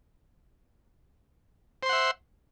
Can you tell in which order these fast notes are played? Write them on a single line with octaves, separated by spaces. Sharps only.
C5 C6 F#5 E5